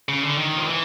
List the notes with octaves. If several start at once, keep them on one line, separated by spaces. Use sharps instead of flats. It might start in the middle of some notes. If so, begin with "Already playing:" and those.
C#3
D3
D#3
F3
E3